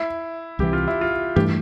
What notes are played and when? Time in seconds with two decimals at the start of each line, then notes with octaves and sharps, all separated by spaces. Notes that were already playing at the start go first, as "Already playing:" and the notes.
Already playing: E4
0.59 C2 C3 E3 G4
0.73 F4
0.88 E4
1.01 F4
1.36 G2 E3 A3 G4